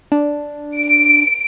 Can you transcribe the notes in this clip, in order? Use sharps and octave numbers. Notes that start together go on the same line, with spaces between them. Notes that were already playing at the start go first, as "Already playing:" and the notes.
D4
D7